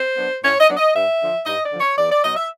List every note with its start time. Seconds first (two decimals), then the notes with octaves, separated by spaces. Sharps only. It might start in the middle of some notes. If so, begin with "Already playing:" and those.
Already playing: C5
0.17 F#3 B3 D4
0.43 A2 C#5
0.60 D#5
0.69 F#3 B3 D4
0.77 D#5
0.94 G2 E5
1.20 D3 F3
1.46 G2 D#5
1.63 D5
1.72 D3 F3
1.80 C#5
1.97 E2 D5
2.11 D5
2.23 B2 F#3 D#5
2.36 E5